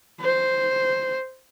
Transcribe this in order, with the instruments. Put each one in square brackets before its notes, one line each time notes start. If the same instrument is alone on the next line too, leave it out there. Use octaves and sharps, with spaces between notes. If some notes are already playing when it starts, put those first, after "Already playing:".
[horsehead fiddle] C5